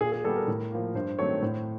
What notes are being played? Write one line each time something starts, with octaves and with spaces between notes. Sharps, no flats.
A#2 G#4
G#4
G3 B3 A4
A#4
A2
F3 A#3
G2 C5
D#3 F#3 A3 C4 C#5
A2 C5